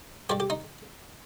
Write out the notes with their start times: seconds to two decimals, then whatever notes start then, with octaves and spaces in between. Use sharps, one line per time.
0.30 G2 G3 G4
0.40 G4
0.50 D#4